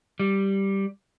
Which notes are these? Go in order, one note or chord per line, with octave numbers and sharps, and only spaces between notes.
G3